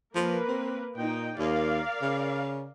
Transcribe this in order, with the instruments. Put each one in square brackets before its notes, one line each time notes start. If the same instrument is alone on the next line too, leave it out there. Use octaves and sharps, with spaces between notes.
[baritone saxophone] F3 [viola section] A#3 A#4 B4
[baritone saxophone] C4
[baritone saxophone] A#2 [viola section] D#4 G5
[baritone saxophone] D#2 [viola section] A#4 D5 F5
[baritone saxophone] C#3